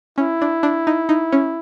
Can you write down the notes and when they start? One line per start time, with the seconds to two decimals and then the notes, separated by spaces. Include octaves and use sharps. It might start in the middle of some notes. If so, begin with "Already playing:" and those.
0.18 C#4 E4
0.42 D4
0.63 D4
0.87 D#4
1.09 D#4
1.32 C#4